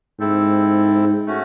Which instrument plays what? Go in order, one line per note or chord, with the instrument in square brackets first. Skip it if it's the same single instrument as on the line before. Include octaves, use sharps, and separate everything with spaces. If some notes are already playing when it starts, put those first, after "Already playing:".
[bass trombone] G#2 [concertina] C4 E4 A4
[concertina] A3 C#4 F#4